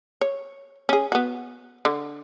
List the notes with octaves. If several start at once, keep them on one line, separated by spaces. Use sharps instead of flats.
C#5
C#4 G#4
B3 F#4
D3